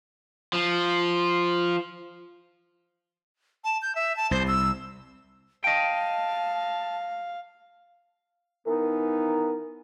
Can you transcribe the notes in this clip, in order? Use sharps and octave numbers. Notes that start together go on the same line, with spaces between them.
F3
A5
G6
E5
A5
C2 C5
E6
D#5 F5 G5 A5
E3 B3 D#4 A#4